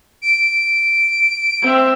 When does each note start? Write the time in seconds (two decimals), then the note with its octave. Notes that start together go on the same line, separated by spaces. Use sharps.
0.22 D7
1.62 C4 E5